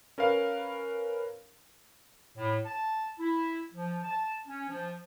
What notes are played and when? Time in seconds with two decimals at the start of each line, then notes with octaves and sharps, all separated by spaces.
0.18 C#4 A#4 B4 F5
2.36 A2
2.65 A5
3.19 E4
3.74 F3
4.04 A5
4.47 C#4
4.69 F3